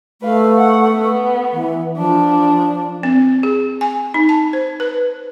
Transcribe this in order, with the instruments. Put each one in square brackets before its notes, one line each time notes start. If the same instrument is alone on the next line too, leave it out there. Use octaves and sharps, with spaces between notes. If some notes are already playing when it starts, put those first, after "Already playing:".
[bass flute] A3 [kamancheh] B4 F5
[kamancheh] F#5
B3
[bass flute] E3
[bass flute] F3 [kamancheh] D4
[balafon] C4
G#4
G#5
D#4
A5
C5
B4